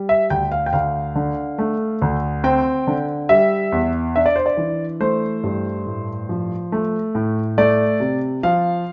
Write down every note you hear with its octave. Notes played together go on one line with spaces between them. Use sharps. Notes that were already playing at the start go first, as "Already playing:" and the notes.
Already playing: G3
E5
D2 G5
F5
G5
D2 F5
D3
A3
D2
C4 G5
D3
G3 E5
E2
D4 E5
D5
C5
D5
E3
A3 C5
G2
A2
F3
A3
A2
A3 D5
C3
F3 F5